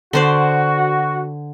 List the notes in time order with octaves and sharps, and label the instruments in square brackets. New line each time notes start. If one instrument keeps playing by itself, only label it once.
[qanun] D3 C5 D5 [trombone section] F#4